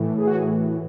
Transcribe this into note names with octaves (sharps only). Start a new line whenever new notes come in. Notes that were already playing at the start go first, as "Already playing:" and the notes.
Already playing: A2 E3
G#4
F#4
G#4